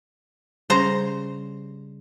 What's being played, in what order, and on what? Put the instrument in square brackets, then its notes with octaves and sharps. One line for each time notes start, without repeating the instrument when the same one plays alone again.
[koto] C#3 C5 A#5 [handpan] G3